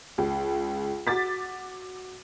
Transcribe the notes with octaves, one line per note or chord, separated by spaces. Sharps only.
C#2
F#4 D6 A6 B6